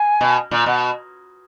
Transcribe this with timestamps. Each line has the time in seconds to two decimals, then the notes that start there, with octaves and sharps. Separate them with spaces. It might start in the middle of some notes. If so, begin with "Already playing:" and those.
Already playing: G#5
0.21 B2
0.51 A#2
0.66 B2 F#5